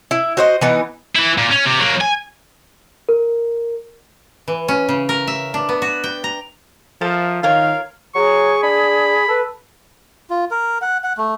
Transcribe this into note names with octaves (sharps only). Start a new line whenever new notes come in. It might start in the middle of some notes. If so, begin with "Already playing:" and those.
E4
F#4 C5 D#5
E3 B3 D#4
E3 E4
A#2
C#4
C3
F#3 A#3
G#5
A#4
E3
C#4
C#3
A#4
E5
D4
B3
F#4
G5
A#5
F3 A4 A#4 E5
D#3 F4 A#4 C#5 F5
F#3 G#4 C#6
D4 B5
A4 B4
F4
A#4
F#5
F#5
A3